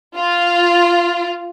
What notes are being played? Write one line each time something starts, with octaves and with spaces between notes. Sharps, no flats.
F4